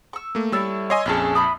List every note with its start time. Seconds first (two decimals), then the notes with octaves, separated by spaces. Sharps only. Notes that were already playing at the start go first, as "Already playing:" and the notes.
0.13 C#6 E6
0.35 A3 A#3
0.52 G3 E4 A4 C#5 E6
0.90 C#5 D#5 G#5 C6
1.06 A#1 F2 C#4 E4 G#4 A5
1.35 E5 B5 D#6